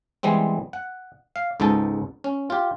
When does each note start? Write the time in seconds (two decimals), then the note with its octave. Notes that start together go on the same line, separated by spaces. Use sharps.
0.23 E3 G3 G#3 B3 C4
0.73 F#5
1.36 F5
1.60 C#2 G#2 B3 D#4 A4 A5
2.24 C#4
2.50 F4 G4